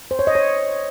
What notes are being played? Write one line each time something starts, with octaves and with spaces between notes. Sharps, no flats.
C5
C#5
D#5
C#5